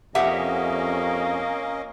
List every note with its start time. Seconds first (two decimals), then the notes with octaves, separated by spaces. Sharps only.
0.15 F2 A#3 C#4 G4 D#5 E5 F#5